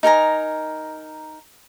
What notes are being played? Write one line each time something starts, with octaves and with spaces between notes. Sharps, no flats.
D#4 A#4 G#5 A#5